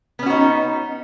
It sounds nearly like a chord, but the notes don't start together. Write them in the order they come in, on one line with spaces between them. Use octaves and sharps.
B3 C#4 F#4 D#4